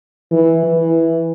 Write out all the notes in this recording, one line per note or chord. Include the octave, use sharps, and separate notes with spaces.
E3
E3